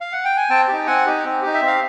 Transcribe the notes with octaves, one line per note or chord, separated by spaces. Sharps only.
F5
F#5
G5
G#5
C4 G5 A5
D#4 G4
C4 F#5 G#5
D#4 G4
C4
D#4 G4
E5
C4
F5